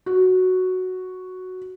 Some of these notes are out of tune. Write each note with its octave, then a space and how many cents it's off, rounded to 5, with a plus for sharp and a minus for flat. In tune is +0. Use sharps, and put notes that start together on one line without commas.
F#4 +0